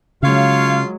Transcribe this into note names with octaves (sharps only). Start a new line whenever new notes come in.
C#3 F#3 G#3 F4 C#5 F5